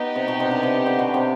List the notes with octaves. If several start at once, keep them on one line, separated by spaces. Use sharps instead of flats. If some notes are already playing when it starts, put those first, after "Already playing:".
Already playing: B3 D#4 G4
C3
B2
C3
D3
C3
D3
B2
C3